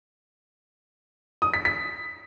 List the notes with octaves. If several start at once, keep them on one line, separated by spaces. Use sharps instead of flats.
D#6
B6
B6